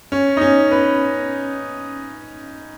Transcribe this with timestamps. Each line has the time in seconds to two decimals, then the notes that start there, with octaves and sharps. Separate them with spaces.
0.12 C#4
0.37 D#4
0.41 C#4
0.71 B4